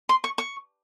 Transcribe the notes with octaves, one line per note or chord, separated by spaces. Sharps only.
C6
C#6
C#6